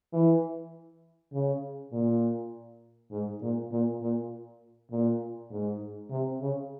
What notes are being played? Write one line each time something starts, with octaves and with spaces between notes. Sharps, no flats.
E3
C#3
A#2
G#2
A#2
A#2
A#2
A#2
G#2
C3
C#3